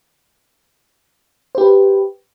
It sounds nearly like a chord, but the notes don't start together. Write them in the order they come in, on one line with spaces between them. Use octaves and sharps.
C5 G4 B4